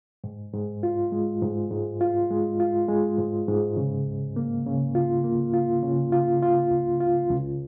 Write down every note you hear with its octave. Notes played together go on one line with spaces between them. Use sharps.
G#2
G#2
F4
G#3
G#2
G#2
F4
G#3
F4
G#3
G#2
G#2
C#3
C#2
A#3
C#3
F4
A#3
F4
C#3
F4
F4
C#2
F4
C#2